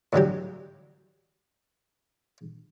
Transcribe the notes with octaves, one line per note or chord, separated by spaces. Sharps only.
A2 D3 F#3 G4